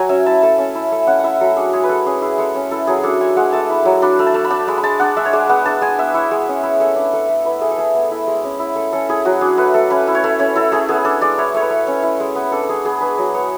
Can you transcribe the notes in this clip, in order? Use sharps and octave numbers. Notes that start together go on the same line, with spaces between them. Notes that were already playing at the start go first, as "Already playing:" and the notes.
Already playing: F#3 G#5
C#4 E5
E4 A5
A3 A5
C#4
E4
A3
C#4 F#5
E4 E5 F#5
F#3 A4
D4 G#4
G#3 G#4
B4
G#3 A4
C#4 G#4
E4 G#4
G#3 A4
C#4
E4 A4
F#3 G#4
G#4
D4 A4
G#3 G#5
G#3 F#5
A3 A5
E4
F#3
D4 B5
A3
A5
A3
B5
D4 A5
G#3 B5
B5
G#3 A5
D4 F#5
G#3 E5
C#5
G#3 D5
B3 F#5
D4 A5
G#3 G#5
B3 E5
E4 C#5
G#3 C#5
C#4
E4
A3
D4
A3
A3
E4 B4
A3 G#4
A4
A3 G#4
B3
E4
G#3
C#4
E4
A3
C#4 A4
E4 G#4
F#3 F#4
D4 G#4
A3 B4
A3 A4
C#4 B4
E4
C#5
A3
C#4 C#5
E4 A4
A3 G#4
B3 G#4
D4 A4
G#3 D5
E4 C#5
A3 C#5
B4
A3
C#4
E4
G#3
B3
D4 A4
A4
G#3 G#4
B3 G#4
D4 B4
F#3
B3 C#5